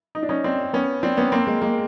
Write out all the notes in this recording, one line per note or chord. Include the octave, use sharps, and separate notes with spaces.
D#4
D4
C#4 D#4
C4 D4
B3 C#4
C4 D4
B3 C#4
A#3 C4
G#3 A#3
G#3 A#3